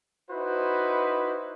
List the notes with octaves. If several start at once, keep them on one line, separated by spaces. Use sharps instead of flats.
D#4 E4 F#4 B4 C5